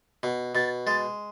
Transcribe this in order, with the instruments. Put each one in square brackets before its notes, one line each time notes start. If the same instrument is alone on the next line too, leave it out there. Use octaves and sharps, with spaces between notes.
[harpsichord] B2
[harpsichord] B2 [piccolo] A6
[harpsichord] G#3 [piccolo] A6